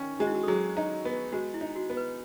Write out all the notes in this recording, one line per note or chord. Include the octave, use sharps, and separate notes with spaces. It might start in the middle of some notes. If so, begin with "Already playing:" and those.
Already playing: D#3 C#4
G#3 F#4
E4
F#4
A4
F#3 G#4
D#4
B3
G#3 F#4
E4
D#4
F#4
B3
B4